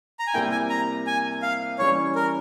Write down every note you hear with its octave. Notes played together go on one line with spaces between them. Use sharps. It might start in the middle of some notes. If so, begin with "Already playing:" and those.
A#5
G#5
C3 G3 A#3 E4 G5
G#5
A#5
G#5
F5
E3 G3 C#4 C#5
A#4